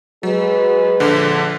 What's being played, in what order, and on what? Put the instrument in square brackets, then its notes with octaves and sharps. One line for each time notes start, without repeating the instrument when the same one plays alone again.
[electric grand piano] F#3 [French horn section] G#3 G#4 B4
[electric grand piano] A#1 D3